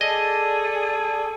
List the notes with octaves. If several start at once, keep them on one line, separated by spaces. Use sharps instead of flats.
G#4 A4 D5 D#5